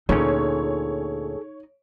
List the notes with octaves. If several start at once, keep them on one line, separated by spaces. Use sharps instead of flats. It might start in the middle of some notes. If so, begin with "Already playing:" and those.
D2 A#2 C#4 D#4 G#4 A4 C#5